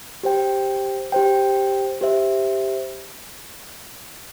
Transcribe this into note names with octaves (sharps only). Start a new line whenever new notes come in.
G4 C5 G5
G4 C5 G5
G4 C5 E5